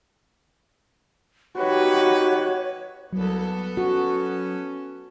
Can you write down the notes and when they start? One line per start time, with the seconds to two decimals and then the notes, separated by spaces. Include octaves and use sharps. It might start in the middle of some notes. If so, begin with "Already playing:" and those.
1.58 D#4 F#4 G4 B4 C#5
3.13 C2 F#3 B3 A4
3.77 C#4 F#4